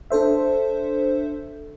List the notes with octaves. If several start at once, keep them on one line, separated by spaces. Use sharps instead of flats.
D4 A4 C5 E5